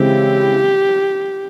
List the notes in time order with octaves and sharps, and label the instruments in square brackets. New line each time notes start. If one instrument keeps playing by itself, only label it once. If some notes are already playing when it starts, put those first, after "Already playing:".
Already playing: [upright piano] C#3 E3 G#3 C4 E4 [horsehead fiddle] G4